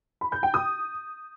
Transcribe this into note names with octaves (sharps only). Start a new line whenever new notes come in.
B5
G6
G5
D#6